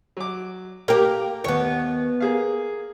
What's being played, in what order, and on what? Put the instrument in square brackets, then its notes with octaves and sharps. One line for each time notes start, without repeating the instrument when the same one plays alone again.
[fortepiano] F#3 D6
[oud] A#3 G4 [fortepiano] A#4 A#5 F6
[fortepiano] D#2 [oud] B3 C#5
[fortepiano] A#3 G#4 F5